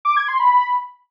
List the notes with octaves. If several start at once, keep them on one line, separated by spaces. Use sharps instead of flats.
D6
G#6
C6
B5